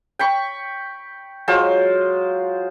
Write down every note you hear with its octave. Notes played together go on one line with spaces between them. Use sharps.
G5 B5 C#6
F#3 G#3 F4 C5